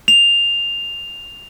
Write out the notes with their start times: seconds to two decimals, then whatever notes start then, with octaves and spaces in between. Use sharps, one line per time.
0.08 F7